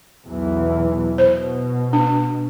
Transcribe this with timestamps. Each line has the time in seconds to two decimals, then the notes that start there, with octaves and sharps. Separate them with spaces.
0.25 B1 E2 E3
1.18 B2 C5
1.93 D4